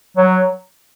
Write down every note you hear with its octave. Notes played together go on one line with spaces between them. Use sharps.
F#3